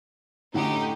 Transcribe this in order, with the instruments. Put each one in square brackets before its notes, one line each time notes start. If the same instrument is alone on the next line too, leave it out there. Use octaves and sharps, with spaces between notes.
[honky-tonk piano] A2 D3 F#5 [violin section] C#4 D#4 G4